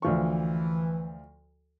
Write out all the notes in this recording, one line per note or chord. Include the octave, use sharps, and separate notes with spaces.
D2 E3 F3 C#6